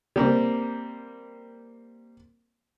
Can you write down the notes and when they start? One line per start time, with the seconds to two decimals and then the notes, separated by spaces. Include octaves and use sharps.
0.16 G3 A#3 C4